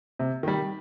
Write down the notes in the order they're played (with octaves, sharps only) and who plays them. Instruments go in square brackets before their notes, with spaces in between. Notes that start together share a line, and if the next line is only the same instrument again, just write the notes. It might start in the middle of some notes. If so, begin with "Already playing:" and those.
[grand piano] C3
D#3 G3